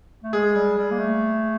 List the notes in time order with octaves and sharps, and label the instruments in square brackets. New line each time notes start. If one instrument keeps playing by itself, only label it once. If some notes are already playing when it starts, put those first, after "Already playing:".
[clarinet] A3
[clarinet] G#3 [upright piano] G#4
[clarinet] G3
G3
A#3
A3